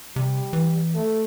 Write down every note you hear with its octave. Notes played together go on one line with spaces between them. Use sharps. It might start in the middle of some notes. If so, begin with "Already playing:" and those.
C3 G3
E3
A3